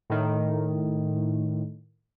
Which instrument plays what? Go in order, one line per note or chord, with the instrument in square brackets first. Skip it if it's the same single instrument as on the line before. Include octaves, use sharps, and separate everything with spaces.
[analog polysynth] A2 D#3